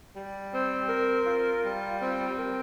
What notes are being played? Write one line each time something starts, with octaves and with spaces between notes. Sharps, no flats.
G3
C4
A#4
F4
G3
C4
A#4